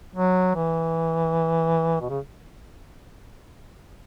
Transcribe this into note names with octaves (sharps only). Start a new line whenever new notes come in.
F#3
E3
B2
C#3